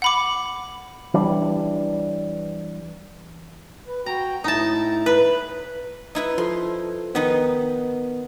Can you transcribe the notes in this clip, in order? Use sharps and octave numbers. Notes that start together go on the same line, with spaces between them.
F#5 B5 D6
E3 G3 D4
B4
F#4 G5 A#5
A2 D#4 E4 A5 A#5
B4
D#4 E4 B4
F3 A4 C6
D#3 B3 D#4 B4